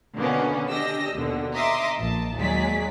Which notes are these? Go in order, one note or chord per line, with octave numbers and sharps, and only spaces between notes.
B2 D3 D#3 A#3 B3 C#4
D4 G4 D#5 E6 A#6
D#2 B2 D3
D#5 E5 A#5 C6 D6 D#6
A#1 A5
D#2 F#3 G#3 G#4 D5 B6